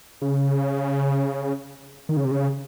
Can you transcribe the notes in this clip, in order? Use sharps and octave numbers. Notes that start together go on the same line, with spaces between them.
C#3
D#3
C#3
C3
C#3